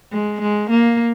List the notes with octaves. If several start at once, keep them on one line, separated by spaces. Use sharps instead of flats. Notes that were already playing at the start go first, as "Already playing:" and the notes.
G#3
G#3
A#3